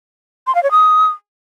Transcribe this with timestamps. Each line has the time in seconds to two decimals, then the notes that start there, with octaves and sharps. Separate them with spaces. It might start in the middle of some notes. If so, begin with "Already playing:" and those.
0.47 C6
0.55 F5
0.63 C#5
0.71 D#6